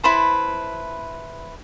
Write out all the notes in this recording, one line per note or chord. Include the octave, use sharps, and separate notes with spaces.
E4 B4 C5 A5